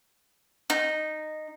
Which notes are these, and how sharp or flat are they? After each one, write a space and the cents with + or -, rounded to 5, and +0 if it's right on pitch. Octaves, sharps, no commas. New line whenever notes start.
D#4 -10